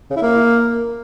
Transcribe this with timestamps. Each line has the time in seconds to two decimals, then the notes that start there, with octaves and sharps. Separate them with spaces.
0.10 C#3
0.16 E4
0.22 A#3